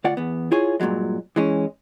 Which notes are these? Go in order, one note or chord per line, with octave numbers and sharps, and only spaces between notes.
D2 F4 D5 F#5
E2 B3
E4 F4 G#4 C#5
G2 A#2 C#3 F#3 G#3
E3 G#3 C#4